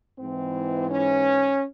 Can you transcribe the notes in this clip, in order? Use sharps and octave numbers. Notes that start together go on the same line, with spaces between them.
G#2 E3 C4
C#4